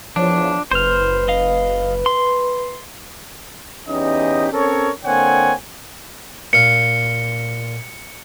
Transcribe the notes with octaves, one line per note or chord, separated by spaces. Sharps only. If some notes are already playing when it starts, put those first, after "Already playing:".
E2 F3 D4 C#5
F#1 B4 C5 F6
D#5 F5
C6
E2 C#4 D#4 G4 D#5
C4 C#4 A4 A#4 C#5
D3 A#3 C4 C#5 F#5 G#5
A#2 F5 C#7